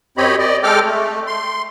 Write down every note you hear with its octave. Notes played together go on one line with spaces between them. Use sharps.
F#2 C4 G4 C#5 D#5 B5
D5 D#5
G#3 A4 G5 D6 F6
A3
C6